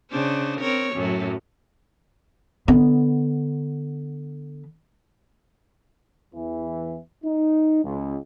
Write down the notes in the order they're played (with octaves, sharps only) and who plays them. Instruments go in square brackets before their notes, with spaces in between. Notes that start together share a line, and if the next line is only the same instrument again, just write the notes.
[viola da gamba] C#3 D4 C5
C4 A#4 C#5
F#2 A2 F#3
[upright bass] D3 B3
[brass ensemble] E2 E3
D#4
C#2